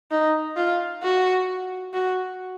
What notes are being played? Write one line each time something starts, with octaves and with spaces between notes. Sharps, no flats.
D#4
F4
F#4
F#4